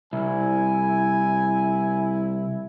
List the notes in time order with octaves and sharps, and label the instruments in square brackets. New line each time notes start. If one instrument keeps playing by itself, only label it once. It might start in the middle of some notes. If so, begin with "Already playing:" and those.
[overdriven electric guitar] C2 [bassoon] E4 [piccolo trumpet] G#5